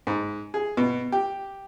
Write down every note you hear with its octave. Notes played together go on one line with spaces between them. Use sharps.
G#2
G#4
B2
G4